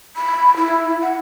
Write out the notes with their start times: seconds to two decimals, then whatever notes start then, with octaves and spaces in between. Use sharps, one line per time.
0.16 B5
0.56 E4
1.02 F#5